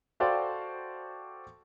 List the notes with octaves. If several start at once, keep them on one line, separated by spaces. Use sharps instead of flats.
F#4 A4 C5 D5 F5 G5